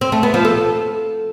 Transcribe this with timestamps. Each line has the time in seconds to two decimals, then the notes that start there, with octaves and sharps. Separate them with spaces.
0.01 C4
0.12 A3
0.23 B3
0.34 F3
0.45 A4